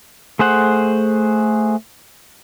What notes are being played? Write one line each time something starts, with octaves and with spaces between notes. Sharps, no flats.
A3 G#4 C5 F#5